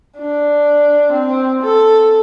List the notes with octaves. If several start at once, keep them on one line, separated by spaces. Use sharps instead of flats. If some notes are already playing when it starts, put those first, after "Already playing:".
D4
C4
A4